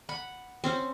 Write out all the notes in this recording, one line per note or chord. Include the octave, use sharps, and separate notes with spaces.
F#5 B5
C4 C#4 C5